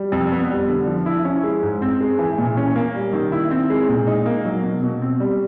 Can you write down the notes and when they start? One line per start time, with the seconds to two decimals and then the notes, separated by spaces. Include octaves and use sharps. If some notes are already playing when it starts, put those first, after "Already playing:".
Already playing: G3
0.12 F2
0.32 B3
0.50 G3
0.69 D3
0.87 F3
1.06 E4
1.25 C#4
1.44 G#3
1.62 G#2
1.82 C4
2.00 G#3
2.19 E3
2.38 A#2
2.57 C#4
2.76 A#3
2.95 G3
3.13 D#3
3.32 E4
3.51 C4
3.70 G#3
3.88 A#2
4.07 D#4
4.26 A#3
4.45 F#3
4.63 B2
4.83 B2
5.02 C4
5.20 G3